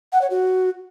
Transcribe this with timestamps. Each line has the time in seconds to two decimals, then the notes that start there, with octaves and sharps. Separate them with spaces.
0.12 F#5
0.21 C#5
0.30 F#4